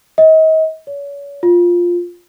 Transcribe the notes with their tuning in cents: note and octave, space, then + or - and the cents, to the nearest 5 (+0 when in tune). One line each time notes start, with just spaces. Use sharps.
D#5 +35
C#5 +35
F4 +5